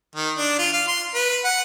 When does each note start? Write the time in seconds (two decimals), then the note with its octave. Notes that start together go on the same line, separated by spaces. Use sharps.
0.15 D#3
0.38 D4
0.59 F4
0.73 F5
0.87 C6
1.14 B4
1.44 F#5